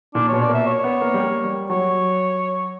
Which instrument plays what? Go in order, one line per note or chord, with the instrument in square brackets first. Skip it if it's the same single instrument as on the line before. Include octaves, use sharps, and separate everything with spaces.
[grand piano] A#2 [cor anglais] D4
[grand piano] B2 [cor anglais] C#5
[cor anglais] D5
[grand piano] A#3 [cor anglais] E5
[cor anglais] C#5
[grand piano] B3
A#3
G3
A#3
G3
[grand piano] F#3 [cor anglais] C#5